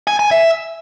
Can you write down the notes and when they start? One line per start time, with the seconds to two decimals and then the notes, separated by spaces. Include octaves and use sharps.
0.07 G#5
0.19 G#5
0.31 E5